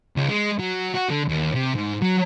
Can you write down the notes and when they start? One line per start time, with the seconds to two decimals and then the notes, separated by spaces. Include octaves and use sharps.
0.16 C#2
0.29 G#3
0.60 F#3
0.95 F#4
1.11 D3
1.29 D#2
1.54 C3
1.75 G#2
2.02 F#3